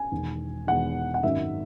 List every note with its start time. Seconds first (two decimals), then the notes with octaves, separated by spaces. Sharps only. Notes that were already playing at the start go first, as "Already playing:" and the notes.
Already playing: G#5
0.11 E1 E2 D#3
0.67 E1 E2 D#3 F#5
1.14 F#5
1.23 G#1 F#2 D#3 F#3 E5